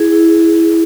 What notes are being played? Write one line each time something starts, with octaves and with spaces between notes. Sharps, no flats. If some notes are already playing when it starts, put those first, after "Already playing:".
Already playing: E4 G#4
E4